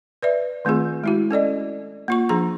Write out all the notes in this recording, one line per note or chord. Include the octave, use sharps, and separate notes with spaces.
B4 D5 E5
D#3 A3 C4 F4 G#4
G#3 E4 F#4
C#4 A4 D5 D#5
A#3 F4 C#6
F3 D4 G#4 A#5